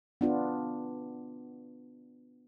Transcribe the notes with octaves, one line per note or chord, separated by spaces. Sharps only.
B3 D4 F4